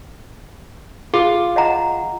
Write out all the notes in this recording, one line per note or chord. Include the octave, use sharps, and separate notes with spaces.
F4 G#4
D#5 F#5 A#5